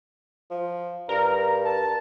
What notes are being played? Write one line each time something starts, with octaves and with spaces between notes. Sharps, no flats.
F3
G2 A#4 A#5
A5